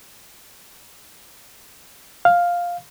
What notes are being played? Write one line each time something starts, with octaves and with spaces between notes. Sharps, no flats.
F5